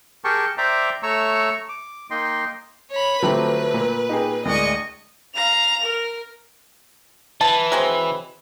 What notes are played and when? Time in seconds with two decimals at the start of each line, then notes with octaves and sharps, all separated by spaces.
0.24 G4 G#4 A#4 G5 A5 C#6
0.58 C5 D5 E5 G5 A#5 D6
1.03 A3 C#5 A#5 C#6 E6
1.69 D6
2.10 A#3 D#4 D#5 G5 C6
2.91 C#5 B5
3.22 D3 F3 F#3 A3 C4 G4 B4
3.74 A#2
4.09 D#4 G4 G#4
4.45 D2 A2 G#3 A#4 D5 D#5 C#6
5.35 F5 A#5 F7
5.82 A#4
7.41 E3 A5
7.72 F#3 G#3 C4